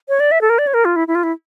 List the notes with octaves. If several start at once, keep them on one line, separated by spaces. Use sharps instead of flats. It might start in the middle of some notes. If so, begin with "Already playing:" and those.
C#5
D5
E5
A4
A#4
D5
C#5
A#4
F4
E4
E4
F4
E4